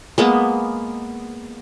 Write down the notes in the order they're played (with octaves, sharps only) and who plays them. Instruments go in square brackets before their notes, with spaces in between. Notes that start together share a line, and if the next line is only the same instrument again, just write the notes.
[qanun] G#3 A#3 B3